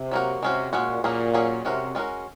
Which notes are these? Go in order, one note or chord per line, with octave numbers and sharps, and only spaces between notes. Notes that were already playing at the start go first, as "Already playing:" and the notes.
Already playing: C3
F#3 A#3 C#4 F#4 A#4
C3 G#3 C#4 F#4
A#2 G#3 C#4 F#4
A#2 F#3 A#3 C#4 G#4
F#3 A#3 C#4 G#4
C3 G#3 C#4 F#4 A#4
G#3 C#4 F#4 A#4